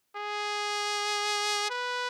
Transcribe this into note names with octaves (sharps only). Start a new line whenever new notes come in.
G#4
B4